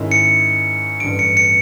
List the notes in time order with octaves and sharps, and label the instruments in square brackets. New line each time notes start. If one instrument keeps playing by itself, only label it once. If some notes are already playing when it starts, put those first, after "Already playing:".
Already playing: [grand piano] G#2 D#3 G#3 C#4 E4
[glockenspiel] C#7
[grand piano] A1 G2 D3 [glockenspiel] D7
[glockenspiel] C#7
C#7